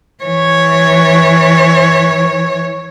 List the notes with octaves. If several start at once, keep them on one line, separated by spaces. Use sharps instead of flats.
E3 C#5